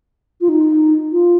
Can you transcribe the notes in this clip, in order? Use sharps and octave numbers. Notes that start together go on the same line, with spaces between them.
F4
D#4
F4